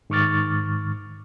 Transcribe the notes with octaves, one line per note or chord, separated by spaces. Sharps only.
G#2 D#3 C#6 D6 F6 A6